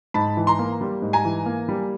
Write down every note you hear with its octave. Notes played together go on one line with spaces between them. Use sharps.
G#2 A5 B5
E3
A#5 C6
A#3
G3
G#2
G#5 A#5
E3
A#3
G3